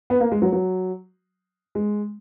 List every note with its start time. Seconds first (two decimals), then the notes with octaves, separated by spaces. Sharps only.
0.10 B3
0.20 A#3
0.31 G#3
0.42 F#3
0.52 F#3
1.75 G#3